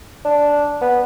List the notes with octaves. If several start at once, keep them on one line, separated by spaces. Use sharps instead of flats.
D4
B3